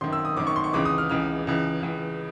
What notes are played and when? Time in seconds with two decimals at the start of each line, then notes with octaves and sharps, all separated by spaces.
0.01 G#1 F#2 D#3 C6
0.12 E6
0.25 D#6
0.37 G#1 F#2 D#3 D6
0.47 C#6
0.56 C6
0.64 C#6
0.73 C#2 C#3 E3 D6
0.85 D#6
0.98 F6
1.10 C#2 C#3 E3 F6
1.47 C#2 C#3 E3
1.83 C#2 C#3 E3